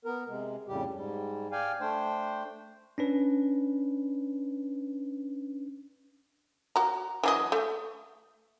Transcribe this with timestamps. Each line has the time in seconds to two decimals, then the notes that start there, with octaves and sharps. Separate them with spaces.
0.05 B3 A#4
0.28 C3 G#3
0.68 F2 A2 C#3 G3 G4
0.94 G#2 G3
1.52 D5 F5 G5 G#5
1.80 A3 D4 C5 G5
2.98 C#4 D4 B4
6.76 F#4 A#5
7.23 E3 F#3 D#5
7.52 A3